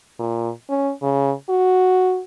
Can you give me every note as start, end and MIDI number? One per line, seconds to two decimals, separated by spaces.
0.19 0.50 46
0.69 0.92 61
1.02 1.33 49
1.50 2.21 66